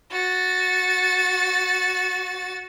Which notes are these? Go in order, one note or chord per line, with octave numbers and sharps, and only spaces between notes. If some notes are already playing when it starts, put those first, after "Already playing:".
F#4 A6